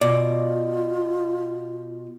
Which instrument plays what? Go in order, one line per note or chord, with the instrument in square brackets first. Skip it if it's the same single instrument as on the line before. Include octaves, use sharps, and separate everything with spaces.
[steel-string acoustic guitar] B2 [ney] F4 [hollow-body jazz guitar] D5